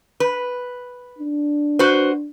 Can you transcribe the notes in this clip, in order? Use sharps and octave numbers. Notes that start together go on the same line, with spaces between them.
B4
D4
F#4 B4 C5